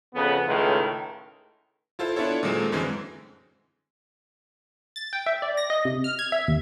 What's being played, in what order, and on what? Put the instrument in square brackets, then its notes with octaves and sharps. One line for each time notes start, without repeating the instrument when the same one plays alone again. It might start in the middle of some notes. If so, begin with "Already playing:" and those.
[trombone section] F2 C#3 B3
C#2 A2 D#3 G#3
[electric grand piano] E4 F4 A4 C5 F5
B3 D4 E4 F4 A4 C#5
A#2 D#3 F#3 G#3 C4 A4
F#2 D3 E3 G#3 C4
[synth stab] A6
G5
E5
D5
A#6
D#5
C3
F6
G#6
E5
D#2